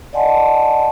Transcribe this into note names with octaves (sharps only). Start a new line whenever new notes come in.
D5 D#5 F#5 G#5 A5 C6